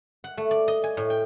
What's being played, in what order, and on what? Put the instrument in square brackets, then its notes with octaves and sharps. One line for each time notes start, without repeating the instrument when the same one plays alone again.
[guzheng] F#5
A3
D5
D#5
G#5
A2
G5